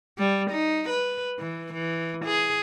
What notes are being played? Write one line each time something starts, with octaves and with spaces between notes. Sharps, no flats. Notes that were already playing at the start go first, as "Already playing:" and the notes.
G3
D#4
B4
E3
E3
G#4